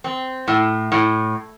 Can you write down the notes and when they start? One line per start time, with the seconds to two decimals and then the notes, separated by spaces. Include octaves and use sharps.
0.04 C4
0.48 A2
0.92 A2